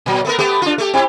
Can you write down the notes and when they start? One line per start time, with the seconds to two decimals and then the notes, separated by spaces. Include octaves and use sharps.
0.06 A#2 F#3
0.25 A3 B3 A#4
0.39 A3 B3 G4
0.62 D4 F4
0.78 A3 G4
0.94 C4 E4 G4